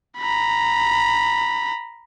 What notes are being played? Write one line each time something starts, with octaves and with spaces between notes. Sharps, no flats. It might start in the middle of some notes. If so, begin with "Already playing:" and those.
A#5 B5